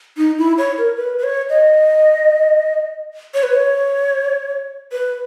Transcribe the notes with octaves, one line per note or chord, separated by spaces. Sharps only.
D#4
E4
C#5
A#4
B4
B4
C#5
D#5
C#5
B4
C#5
B4